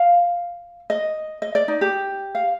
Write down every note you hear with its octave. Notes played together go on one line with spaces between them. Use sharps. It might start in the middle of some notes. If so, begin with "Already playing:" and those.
Already playing: F5
D#5
D#5
D5
D#4
G4
F5